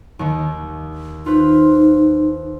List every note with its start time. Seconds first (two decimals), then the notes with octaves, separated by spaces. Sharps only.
0.19 D#2 D#3
1.26 D#4 F4 B4 C5